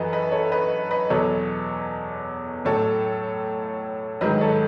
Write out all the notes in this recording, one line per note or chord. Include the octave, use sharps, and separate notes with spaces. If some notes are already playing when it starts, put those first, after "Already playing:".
Already playing: F#2 E3 F#4 A4 B4 D#5
B4 D#5
A4 C#5
B4 D#5
B4 D#5
E2 B2 F#3 A4 C#5
A2 F#3 A4 C#5
G#2 D#3 F#3 B4 D#5
A4 C#5